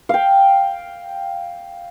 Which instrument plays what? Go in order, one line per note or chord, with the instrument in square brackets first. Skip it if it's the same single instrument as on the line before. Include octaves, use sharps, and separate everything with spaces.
[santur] F5 G5